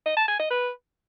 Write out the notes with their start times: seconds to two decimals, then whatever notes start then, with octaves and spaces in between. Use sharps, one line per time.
0.06 D#5
0.17 A5
0.28 G#5
0.39 D#5
0.50 B4